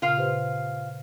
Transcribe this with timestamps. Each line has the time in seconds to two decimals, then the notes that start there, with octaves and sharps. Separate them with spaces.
0.02 A#2 C#3 F4 F5
0.17 G4 B4 C5